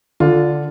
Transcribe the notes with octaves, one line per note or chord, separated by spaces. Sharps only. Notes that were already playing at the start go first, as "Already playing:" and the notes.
D3 F4